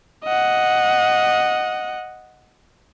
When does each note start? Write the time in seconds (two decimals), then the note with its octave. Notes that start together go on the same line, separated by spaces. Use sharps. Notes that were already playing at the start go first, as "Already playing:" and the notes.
0.24 D#5 F#5